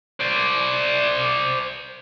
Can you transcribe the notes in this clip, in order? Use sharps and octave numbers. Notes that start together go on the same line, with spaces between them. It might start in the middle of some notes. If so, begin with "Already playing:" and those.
C5 D5